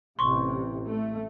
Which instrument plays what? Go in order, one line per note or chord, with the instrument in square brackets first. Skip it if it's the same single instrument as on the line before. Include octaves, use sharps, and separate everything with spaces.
[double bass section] A1 C3 [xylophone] C6 C#6
[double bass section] A3